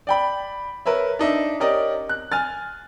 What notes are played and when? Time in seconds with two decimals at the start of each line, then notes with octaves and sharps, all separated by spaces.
0.07 D5 G5 B5
0.86 A#4 B4 C#5 E5
1.19 D4 D#4 E5
1.60 C#4 G4 A#4 D5 D#5
2.09 F#6
2.32 G#5 F6 A6